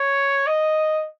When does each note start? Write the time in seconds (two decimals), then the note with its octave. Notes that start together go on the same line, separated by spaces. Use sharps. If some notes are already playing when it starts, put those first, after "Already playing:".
Already playing: C#5
0.47 D#5